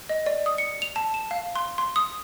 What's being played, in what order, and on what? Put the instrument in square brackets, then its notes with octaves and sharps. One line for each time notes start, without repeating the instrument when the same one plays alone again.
[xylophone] D#5
D5
D#6
C#7
F7
A5
E7
F5
C6
C6
D#6